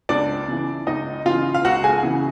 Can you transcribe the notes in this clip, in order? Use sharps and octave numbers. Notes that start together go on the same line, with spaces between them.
C#2 D4 D5
C#3 E3
C#2 D#4 D#5
C#3 E3 F4 F5
F5
C#2 F#4 F#5
G#4 G#5
C#3 E3